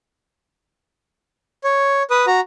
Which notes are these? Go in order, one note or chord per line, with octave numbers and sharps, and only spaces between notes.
C#5
B4 D#6
F#4 A#5